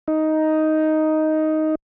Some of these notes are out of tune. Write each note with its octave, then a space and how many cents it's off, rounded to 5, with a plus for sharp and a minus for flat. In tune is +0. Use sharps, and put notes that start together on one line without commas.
D#4 +5